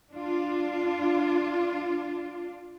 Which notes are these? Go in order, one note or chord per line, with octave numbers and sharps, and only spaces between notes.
D4 F4